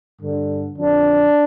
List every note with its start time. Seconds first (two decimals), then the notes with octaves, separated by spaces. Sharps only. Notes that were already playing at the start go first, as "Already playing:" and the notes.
0.21 G2 D3
0.77 F2 D3 D4